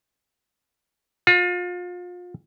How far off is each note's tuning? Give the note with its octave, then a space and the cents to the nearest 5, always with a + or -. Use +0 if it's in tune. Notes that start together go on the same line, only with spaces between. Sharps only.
F4 +35